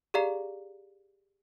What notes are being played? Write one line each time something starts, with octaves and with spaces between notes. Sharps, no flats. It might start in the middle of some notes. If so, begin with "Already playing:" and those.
G4 G#4 D5 F5 A#5 C7